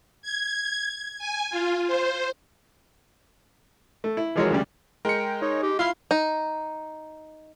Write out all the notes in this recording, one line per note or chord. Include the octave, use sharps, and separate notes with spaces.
G#6
G#5
F4
C5
A3
E4
E3 F3 G#3 F#4 A#4 C#5
D2 C#3 G3
G#3 A#4 G5 C#7
D#4 C#5
G4
E4 F4 F5 C6
D#4